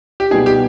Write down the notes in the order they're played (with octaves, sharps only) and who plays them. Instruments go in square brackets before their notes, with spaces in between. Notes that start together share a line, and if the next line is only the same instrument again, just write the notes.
[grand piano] G4
[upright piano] B2 G3 B3 D#4 [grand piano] G#4
[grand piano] G4